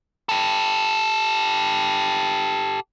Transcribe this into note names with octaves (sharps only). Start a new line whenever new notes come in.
G4 A4